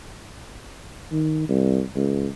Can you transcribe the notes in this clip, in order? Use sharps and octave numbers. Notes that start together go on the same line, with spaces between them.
D#3
C2
C#2